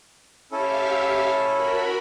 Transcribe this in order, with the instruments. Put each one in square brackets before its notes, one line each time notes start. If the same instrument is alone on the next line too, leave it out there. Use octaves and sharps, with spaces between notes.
[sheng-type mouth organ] C#4 E4 A4 [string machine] G4 E5 F5
[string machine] F#4 A#4 B5